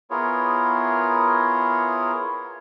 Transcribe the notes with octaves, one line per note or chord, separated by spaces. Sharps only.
B3 E4 F4 G#4 A#4 C#5